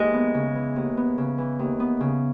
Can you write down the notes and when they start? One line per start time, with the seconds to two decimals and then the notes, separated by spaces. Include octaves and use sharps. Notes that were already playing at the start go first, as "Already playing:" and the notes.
Already playing: D#2 E3 G#3
0.14 B3
0.34 C#3
0.55 E3
0.76 D#2
0.97 B3
1.18 C#3
1.38 E3
1.59 D#2
1.80 B3
2.00 C#3